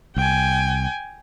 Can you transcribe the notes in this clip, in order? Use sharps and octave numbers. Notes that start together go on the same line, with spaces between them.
C2 G5 G#5